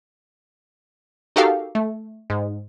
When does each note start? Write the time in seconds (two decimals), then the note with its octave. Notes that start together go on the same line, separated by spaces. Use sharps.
1.36 D#4 F#4 G4 A4 A#4 F5
1.75 A3
2.30 G#2